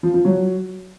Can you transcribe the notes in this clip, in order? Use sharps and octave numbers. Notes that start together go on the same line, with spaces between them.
F3
F3
F#3